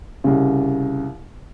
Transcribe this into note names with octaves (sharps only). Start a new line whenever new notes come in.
C2 C#3